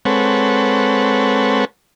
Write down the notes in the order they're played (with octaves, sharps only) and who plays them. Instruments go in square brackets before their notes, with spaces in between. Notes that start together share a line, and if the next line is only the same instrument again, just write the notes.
[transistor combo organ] G#3 C4 A4 B4 C#5 F#5